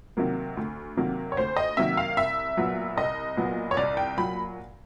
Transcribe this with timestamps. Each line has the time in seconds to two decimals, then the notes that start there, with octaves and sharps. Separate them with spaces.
0.17 C3 D#3 F#3 A#3
0.57 D2
0.97 C3 D#3 F#3 A#3
1.32 C#5
1.37 D2 C5
1.57 D#5
1.77 C3 D#3 F#3 A#3 E5
1.97 F5
2.17 C2 E5
2.57 A#2 F#3 B3
2.97 C2 D#5
3.37 A#2 F#3 B3
3.71 C#5
3.77 C2 D5
3.97 G5
4.17 A#2 F#3 B5